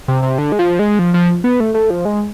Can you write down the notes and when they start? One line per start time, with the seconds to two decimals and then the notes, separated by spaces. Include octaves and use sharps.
0.08 C3
0.23 C3
0.38 D3
0.52 G#3
0.59 F3
0.79 G#3
0.99 F3
1.14 F3
1.44 B3
1.60 A3
1.74 A3
1.90 F3
2.05 G#3